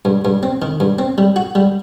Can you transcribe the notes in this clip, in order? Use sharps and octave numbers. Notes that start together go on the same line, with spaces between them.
G2
G2
C4
D#3
G2
C4
G3
F#4
G3